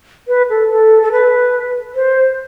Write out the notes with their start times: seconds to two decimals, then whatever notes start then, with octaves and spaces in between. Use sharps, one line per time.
0.28 B4
0.50 A4
0.71 A4
1.02 A4
1.12 B4
1.95 C5